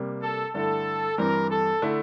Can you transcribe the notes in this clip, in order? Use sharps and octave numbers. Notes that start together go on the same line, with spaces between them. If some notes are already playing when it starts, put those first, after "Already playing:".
Already playing: C3 G3 A#3
A4
G2 D3 A3 E4 A4
G2 E3 G3 C4 A#4
A4
D3 A3 E4